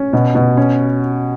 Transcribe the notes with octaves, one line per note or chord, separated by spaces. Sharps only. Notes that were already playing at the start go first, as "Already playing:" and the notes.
Already playing: C#4
B2
B2
C#4